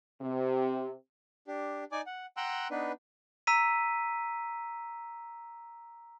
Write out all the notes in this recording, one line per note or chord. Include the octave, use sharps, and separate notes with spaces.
C3
D4 G4
D#4 D5 G#5 D6
F#5
F#5 G5 A#5 C6 E6 F#6
B3 D4 D#4 B4
A#5 E6 B6 D#7